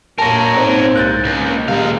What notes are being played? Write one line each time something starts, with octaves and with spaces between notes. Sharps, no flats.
A#2 A#3 A#4 C#5 A5 A#6
G#2 C4
C2 G#2 F#6 G6 A6
C#2 A#3
D#1 G#3 F5